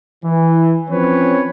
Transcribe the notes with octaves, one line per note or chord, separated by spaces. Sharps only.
E3
F3 C4 C#4 B4 C#5